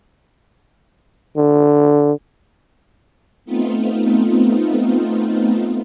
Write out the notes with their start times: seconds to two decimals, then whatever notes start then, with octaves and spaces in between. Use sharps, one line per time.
1.37 D3
3.45 A3 B3 C4 D#4 F4